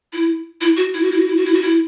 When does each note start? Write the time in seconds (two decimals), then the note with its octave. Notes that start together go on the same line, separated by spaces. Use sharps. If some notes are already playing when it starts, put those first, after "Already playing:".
0.13 E4
0.61 E4
0.77 F#4
0.94 E4
1.02 F#4
1.11 E4
1.20 F#4
1.27 E4
1.37 F#4
1.45 E4
1.54 F#4
1.62 E4